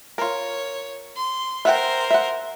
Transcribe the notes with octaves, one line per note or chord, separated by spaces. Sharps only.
F4 A#4 C#5
C6
A#4 C5 E5 F#5 G5
E5 F#5